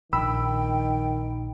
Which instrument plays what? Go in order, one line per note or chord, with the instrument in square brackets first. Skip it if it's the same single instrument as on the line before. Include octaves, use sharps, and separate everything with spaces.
[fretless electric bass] A#1 [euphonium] D#3 [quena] G5 [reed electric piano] B5 E6